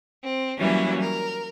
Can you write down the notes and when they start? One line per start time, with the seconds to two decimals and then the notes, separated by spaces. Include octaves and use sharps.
0.24 C4
0.58 E3 F#3 G3 A#3 C#4 E4
1.00 A#4